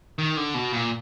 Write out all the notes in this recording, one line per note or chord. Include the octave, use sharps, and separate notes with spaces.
D#3
D3
B2
A#2